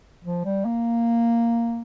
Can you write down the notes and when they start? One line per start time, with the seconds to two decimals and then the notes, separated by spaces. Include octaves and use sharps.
0.25 F3
0.45 G3
0.65 A#3